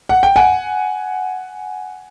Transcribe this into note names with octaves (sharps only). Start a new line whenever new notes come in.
F#5
G5
F#5 G#5